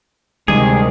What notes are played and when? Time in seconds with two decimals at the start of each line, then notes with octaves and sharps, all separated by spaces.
0.48 D2 C3 D#3 G3 G#3 G#4 G#5